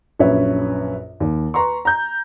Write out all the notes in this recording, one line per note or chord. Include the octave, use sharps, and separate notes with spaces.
A#1 F#2 B4 C#5 E5
D#2
B4 A#5 C6 C#6
A#5 G6